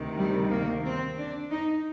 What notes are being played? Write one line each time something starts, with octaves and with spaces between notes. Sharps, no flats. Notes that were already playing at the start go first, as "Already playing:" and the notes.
Already playing: D2 C3 D#3
G3
A#3
C4
D4
D#4